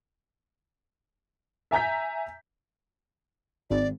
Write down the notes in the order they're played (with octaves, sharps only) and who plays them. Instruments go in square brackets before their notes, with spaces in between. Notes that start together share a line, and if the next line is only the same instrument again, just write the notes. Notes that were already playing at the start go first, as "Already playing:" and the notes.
[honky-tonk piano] E5 G#5 A#5 G6 B6
[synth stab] G#1 [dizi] D5